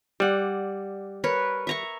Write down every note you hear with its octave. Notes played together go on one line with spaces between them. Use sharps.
G3 D5 F#5
A#4 B4 C#5
E5 A#5 C#6